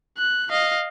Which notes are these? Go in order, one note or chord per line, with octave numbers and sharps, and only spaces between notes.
F#6
D#5 F5